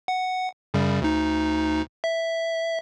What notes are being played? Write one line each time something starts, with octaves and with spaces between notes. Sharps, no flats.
F#5
F#2 C#3 G3
D2 D#4
E5